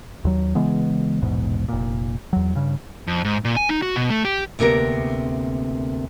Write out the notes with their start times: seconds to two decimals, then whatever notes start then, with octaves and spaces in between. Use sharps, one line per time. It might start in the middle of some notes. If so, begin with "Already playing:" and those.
0.25 D#2 F#3
0.55 C#3 E3 G#3 B3
1.22 A#1 E2 G#2 B2
1.68 F1 A#2
2.33 E2 F#3
2.55 G2 C#3
3.07 F2
3.25 G#2
3.45 A#2
3.57 G#5
3.69 D#4
3.82 F#4
3.96 B2
4.10 A3
4.25 G4
4.59 D2 C3 A#3 B3 A#4